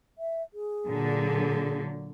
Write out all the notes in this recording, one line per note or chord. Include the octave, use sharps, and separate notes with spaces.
E5
G#4
A#2 D3 F#3